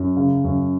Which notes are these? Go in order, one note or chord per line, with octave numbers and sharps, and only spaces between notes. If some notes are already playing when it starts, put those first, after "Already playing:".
Already playing: F#2
C#3
F#2